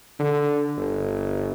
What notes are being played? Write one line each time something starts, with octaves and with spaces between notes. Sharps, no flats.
D3
G1